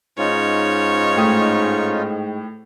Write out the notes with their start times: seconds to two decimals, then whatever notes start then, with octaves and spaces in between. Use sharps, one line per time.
0.18 G#2 C#4 D#4 F4 C#5
1.16 A2 G4 D#6